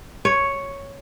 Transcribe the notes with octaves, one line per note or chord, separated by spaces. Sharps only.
C#5